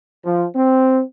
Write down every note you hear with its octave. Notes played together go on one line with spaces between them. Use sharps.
F3
C4